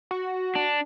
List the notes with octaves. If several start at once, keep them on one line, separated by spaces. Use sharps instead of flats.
F#4
D4